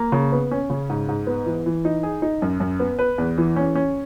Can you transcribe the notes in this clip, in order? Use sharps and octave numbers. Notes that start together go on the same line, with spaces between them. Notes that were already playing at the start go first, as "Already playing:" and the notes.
Already playing: A#3
C#3
B3
C#4
C#3
G#2
G#2
B3
E3
E3
D#4
G#4
D#4
F#2
F#2
B3
B4
E2
E3
C#4
C#4